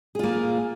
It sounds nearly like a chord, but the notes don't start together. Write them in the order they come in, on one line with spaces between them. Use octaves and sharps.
G#4 F4 A#3